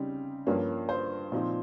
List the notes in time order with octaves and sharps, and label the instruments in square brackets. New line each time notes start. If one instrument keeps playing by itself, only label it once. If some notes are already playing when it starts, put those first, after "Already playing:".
Already playing: [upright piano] C#3 G3 C4 D#4
G2 F3 A#3 C#4
C5
A#2 F3 C4 D#4